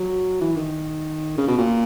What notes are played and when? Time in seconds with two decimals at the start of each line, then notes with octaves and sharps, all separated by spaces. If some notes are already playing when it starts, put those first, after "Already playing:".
Already playing: F#3
0.41 E3
0.56 D#3
1.37 C#3
1.47 B2
1.58 A#2